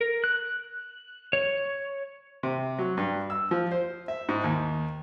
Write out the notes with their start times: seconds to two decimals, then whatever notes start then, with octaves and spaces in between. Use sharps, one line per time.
0.01 A#4
0.24 F#6
1.33 C#5
2.43 C3
2.79 F#3
2.97 G2
3.30 E6
3.51 F3
3.72 C5
4.08 E5
4.29 G#2
4.44 D#2